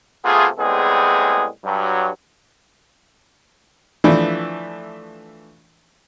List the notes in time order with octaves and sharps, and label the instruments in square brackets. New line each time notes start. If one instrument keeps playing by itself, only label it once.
[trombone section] C3 A3 B3 F4 G#4
A2 G3 G#3 B3 C4 G#4
G2 F#3
[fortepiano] E3 F3 A3 D4